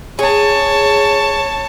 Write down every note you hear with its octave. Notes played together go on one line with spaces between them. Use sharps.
G#4 C#5 A5